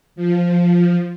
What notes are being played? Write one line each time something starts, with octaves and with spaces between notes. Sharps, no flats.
F3